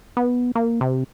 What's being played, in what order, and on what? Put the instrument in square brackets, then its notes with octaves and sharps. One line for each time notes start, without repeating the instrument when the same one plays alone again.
[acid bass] B3
A#3
C3